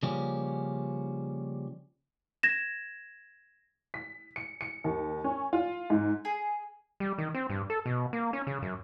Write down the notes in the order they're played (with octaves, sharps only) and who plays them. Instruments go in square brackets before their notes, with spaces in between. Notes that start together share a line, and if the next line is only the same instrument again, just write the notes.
[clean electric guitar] C#3 F3 G3 A#3 C#4
[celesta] G#6 A#6 E7
[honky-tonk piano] B6
C#7
C#7
D#2
C#4
F4
G#2
[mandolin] G#4
[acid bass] G3
D#3
C4
G2
A4
B2
A#3
C#4
C#3
F#2